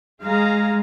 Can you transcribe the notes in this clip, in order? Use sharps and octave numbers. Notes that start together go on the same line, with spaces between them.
G#3 G#4 F5 A#5